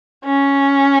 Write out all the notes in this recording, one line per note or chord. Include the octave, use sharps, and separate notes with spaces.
C#4